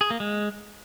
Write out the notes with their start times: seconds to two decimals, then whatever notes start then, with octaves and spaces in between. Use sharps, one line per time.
0.01 G#4
0.10 A#3
0.20 G#3